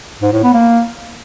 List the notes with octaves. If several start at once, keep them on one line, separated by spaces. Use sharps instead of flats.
G#2
A2
B3
A#3